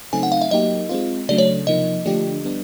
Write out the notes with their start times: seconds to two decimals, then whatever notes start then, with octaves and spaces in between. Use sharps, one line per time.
0.13 C#3 F#3 A3 C4 D#4 G#5
0.23 F#5
0.32 F5
0.42 E5
0.51 F#3 A#3 D#4 G4 D#5
0.89 G#3 C4 F4
1.29 C#3 F#3 A3 D4 D5
1.38 C#5
1.67 C3 F3 A#3 D#4 D#5
2.06 D3 F3 A3 D4 G4
2.44 G3 B3 D4